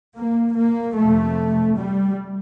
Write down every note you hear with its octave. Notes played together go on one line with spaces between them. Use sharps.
A#3
A#3
F2 C3 A3
G3